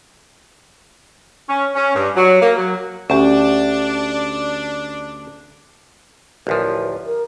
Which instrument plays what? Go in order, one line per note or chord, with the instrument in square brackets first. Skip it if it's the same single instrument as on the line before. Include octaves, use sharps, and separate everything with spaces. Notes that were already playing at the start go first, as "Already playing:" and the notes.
[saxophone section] C#4
C#4
G2
F#3
A#3
F#3
[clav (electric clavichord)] D2 [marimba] C#4 G4 [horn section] D4
[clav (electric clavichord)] A1 D2 F3 [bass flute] A#4
[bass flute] A#4